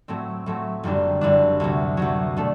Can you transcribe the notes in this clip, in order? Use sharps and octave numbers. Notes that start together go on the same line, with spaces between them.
A2 F#3 A3 C4
A2 F#3 A3 C4
F#1 F#2 D3 G3 D4
F#1 F#2 D3 G3 D4
D2 C3 F#3
D2 C3 F#3
B2 A3 D4